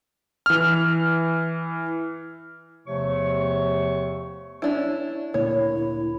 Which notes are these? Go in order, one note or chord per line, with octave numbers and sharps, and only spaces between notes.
E3 F6
E2 C3 F3 A3 C#5 C#6
C#4 D4 E4
D2 A#2 A#3 E4 C#5